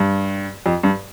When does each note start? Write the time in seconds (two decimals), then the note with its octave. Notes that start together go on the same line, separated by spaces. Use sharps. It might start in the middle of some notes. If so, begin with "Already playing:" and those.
Already playing: G2
0.66 F2
0.83 G2